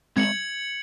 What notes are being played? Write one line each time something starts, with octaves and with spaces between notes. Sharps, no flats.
G#3 C4 G#6 C#7 F#7